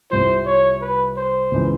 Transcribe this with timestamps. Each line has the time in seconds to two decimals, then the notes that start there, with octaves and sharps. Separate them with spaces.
0.10 C2 C3 F3 C5
0.46 C#5
0.81 B4
1.17 C5
1.51 C#2 C#3 E3 G#3